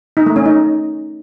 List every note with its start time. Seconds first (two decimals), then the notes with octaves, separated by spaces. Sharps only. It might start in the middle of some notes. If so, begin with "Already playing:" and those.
0.17 D#4
0.26 A3
0.36 C#4
0.46 D#4